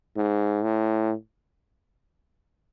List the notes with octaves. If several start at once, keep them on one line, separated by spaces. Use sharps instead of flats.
G#2
A2